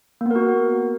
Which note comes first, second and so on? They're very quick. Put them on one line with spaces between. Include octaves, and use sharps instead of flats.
A#3 B3 A#4 F#4